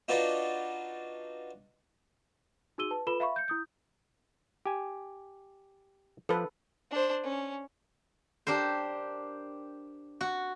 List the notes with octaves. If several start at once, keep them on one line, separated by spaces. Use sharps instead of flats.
D4 D#4 F4 F#4 B4 D5
D#4 F#4 G#4 E6 D#7 G7
B4 A5
F4 A4 B4 B5 E7 G7
E5 F5 B5 C#6
G6 C#7
E4 D#6 G6
G4 G#5
F3 A4 B4
D4 C5
C#4
D4 G4 A#4 C5
F#4